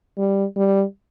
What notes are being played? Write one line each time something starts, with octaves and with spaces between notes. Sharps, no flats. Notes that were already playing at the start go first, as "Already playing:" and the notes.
G3
G3